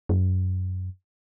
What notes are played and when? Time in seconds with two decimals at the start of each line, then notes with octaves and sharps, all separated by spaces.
0.09 F#2